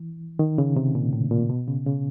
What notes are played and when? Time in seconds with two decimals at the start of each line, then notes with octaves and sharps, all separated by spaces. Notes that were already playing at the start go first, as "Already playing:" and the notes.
Already playing: E3
0.39 D#3
0.58 C#3
0.76 C3
0.95 A#2
1.13 A2
1.31 A#2
1.50 B2
1.67 C#3
1.86 C#3